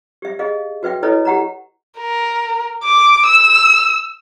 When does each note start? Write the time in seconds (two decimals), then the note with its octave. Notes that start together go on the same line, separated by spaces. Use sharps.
0.22 G4 E5
0.39 G#4 D#5 F5
0.83 F#4 B4 E5 G5
1.03 E4 A4 B4 C#5 D#5 E5
1.25 G4 F#5 A#5
1.98 A#4
2.84 D6
3.26 E6